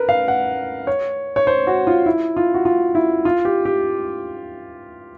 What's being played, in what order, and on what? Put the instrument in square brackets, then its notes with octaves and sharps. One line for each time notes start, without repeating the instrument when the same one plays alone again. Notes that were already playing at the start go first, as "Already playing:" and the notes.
Already playing: [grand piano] A#4 B4
F5
F#5
C#5
C#5
C5
F#4
F4
E4
F4
F#4
F4
E4
F4
G4
G4